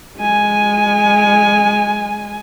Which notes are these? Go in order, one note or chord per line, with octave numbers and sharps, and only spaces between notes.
G#3 G#5